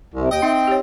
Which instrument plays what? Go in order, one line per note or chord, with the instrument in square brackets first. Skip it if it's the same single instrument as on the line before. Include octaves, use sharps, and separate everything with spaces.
[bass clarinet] C2 [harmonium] C3
[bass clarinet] D#2 [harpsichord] D#5 [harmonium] G5
[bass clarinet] C4 [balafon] D#4 E5
[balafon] G4 C#5